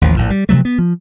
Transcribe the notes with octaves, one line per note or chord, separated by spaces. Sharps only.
A1 D#2 F3
A#1 A2
G3
C3 F3 F#3 A3
B3
F3